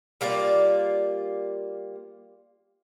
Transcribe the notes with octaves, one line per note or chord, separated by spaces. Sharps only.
G3 A#3 F4 D5